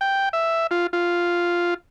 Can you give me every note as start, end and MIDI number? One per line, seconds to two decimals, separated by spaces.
0.01 0.29 79
0.33 0.67 76
0.71 0.87 65
0.93 1.74 65